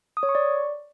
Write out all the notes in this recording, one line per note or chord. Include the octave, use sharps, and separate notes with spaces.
D#6
C#5
C#6
D5